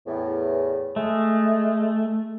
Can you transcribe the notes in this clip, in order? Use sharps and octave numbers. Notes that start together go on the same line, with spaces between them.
E2 A2
G#3 A3